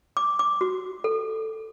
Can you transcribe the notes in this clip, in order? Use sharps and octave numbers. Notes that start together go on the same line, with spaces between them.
D6
D6
F#4
A4